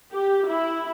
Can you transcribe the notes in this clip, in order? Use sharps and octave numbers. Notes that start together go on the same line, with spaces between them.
G4
E4